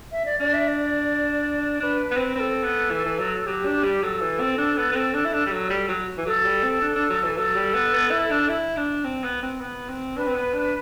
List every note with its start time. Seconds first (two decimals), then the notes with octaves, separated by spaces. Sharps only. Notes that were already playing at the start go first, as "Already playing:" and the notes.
0.12 E5
0.26 D5
0.40 D4 D5
0.54 E5
0.68 D5
1.79 D4 B4 D5
2.11 B3
2.16 C4
2.35 C4 A4 B4
2.63 B3
2.91 E3
3.05 E3
3.19 F#3
3.47 F#3 G4
3.66 D4
3.84 G3
4.02 F#3 A4
4.21 E3
4.40 C4
4.58 D4
4.78 B3
4.92 B3
4.95 C4
5.14 D4
5.25 E4
5.33 D4
5.46 G3
5.52 F#3
5.70 G3
5.88 F#3
6.18 E3
6.26 F#3 A4
6.45 G3
6.64 C4
6.81 D4
6.96 D4
7.10 F#3
7.23 E3
7.37 F#3 A4
7.56 G3
7.74 B3
7.94 B3
8.11 E4
8.31 D4
8.49 E4
8.77 D4
9.04 C4
9.24 B3
9.43 C4
9.60 B3
9.89 C4
10.17 D4 B4
10.27 C4
10.35 B3
10.53 D4